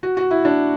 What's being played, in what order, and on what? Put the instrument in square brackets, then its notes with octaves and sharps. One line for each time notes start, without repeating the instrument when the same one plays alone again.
[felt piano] F#4
F#4
E4
D4